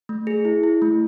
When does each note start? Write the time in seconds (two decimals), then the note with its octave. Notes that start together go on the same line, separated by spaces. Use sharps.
0.09 A3
0.27 G#4
0.45 E4
0.63 E4
0.82 A3